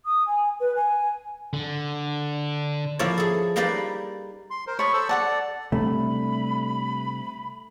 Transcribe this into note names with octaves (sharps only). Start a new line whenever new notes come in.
D#6
G#5
B4
G#5
D3
F3 A#3 E4 F4 C#5 D5
G#4 A4
G3 A#3 D#4 B4 D5 G5
C6
A#4 C5
C#5 A5 B5 C#6 D#6
A4 C5 E6
A4 D5 F#5 A5
C3 G3 A3 D4 B5